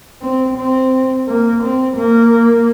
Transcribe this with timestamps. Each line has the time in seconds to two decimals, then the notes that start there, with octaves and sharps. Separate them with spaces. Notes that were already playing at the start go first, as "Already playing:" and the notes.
0.21 C4
0.57 C4
1.28 A#3
1.62 C4
1.97 A#3